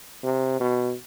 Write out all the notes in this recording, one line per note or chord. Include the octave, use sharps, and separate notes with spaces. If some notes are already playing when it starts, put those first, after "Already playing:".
C3
B2